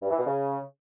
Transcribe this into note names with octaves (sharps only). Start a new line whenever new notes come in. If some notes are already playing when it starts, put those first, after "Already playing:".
G2
E3
B2
C#3